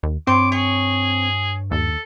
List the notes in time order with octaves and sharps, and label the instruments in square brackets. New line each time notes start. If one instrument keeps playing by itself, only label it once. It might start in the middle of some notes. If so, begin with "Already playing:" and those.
[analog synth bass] D#2
[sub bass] G2 [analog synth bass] C4 [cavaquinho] C#5 C6 [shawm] D6
[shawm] G#4 [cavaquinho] C#5
[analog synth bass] D#2 [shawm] A4